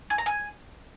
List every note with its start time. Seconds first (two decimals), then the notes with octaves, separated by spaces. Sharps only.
0.10 G#5
0.18 A#5
0.26 G#5